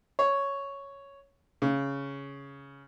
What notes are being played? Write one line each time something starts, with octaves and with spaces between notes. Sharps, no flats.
C#5
C#3